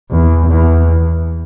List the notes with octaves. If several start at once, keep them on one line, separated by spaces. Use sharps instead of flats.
E2
E2